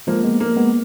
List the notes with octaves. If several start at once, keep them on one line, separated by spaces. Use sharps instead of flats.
F3 G#3 A#3
G#3 B3
A#3
G#3 B3